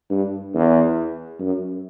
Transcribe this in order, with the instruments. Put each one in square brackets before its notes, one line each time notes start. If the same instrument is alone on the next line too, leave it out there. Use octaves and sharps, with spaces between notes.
[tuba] G2
E2
F#2